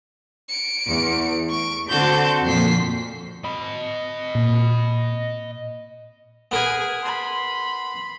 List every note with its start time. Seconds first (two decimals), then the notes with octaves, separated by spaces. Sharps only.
0.49 C#7 D7
0.89 E2
1.49 A3 C#6 D7
1.89 D3 C4 F#4 A4 G6
2.45 F2 A#2 F3 B6 C7
3.44 D#5 B5
4.35 A#2
6.51 B3 G#4 A#4 B4 G#5
7.03 B5 C6